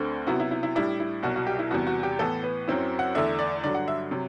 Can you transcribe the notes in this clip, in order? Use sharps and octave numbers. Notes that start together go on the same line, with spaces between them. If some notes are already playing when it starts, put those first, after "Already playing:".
Already playing: D2 D3 A3 C4
C3 F#3 B3 E4 F#4
E4
E4
E4
A2 G3 D4 E4
E4
C2 B2 F#3 F#4
F#4
G4
E4
E2 C3 G3 B3 F#4
F#4
G4
A2 E3 B3 A4
B4
F#2 F#3 C4 E4
F#5
E2 D3 A3 D4 E5
D5
G2 D3 F#3 D5
F#5
E5
C3 F#3